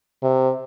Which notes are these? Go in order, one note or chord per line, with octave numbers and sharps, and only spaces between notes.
C3